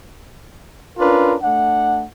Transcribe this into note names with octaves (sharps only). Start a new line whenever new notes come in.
C#4 D4 F4 A#4 B4
A3 D4 F#5